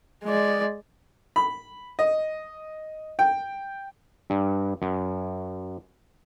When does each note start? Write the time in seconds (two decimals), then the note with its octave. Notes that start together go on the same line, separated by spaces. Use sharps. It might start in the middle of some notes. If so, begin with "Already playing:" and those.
0.24 G#3 D5
1.36 B5
1.99 D#5
3.19 G5
4.30 G2
4.82 F#2